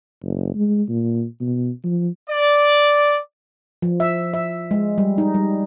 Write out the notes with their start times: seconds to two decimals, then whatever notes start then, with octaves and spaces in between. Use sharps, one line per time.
0.23 F#1
0.55 G#3
0.89 A#2
1.41 B2
1.84 F3
2.30 D5
3.82 F3
4.00 E5
4.34 E5
4.71 G#3
4.98 G3
5.18 D#4
5.34 G3